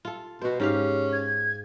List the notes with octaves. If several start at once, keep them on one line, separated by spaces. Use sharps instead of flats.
F4 A4
B2 F#4 C5
G#2 C#4 G4 F5
G#6